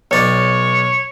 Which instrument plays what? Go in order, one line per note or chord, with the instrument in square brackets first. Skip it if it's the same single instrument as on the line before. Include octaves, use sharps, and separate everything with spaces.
[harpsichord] B1 D5 [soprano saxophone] C#5